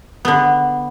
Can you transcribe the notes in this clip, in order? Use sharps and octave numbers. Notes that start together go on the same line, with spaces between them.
D3 B3